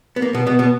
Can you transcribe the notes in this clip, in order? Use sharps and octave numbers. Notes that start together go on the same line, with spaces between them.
B3
A#3
B2 B3
B2 B3
B2 B3